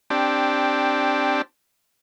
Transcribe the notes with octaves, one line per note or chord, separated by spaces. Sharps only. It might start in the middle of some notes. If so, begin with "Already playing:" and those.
C4 D4 G4